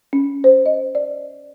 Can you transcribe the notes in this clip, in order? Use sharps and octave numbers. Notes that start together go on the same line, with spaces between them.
C#4
C5
D#5
D5